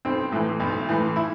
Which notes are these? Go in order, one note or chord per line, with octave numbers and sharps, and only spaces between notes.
B1 C4
A2 E3
B1
A2 E3
E4